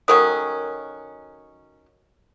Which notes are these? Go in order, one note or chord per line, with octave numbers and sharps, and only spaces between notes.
D#3 F#3 C#4 A4 A#4 D#6